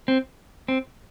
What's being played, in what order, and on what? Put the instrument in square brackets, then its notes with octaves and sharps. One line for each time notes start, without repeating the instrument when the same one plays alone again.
[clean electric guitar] C4
C4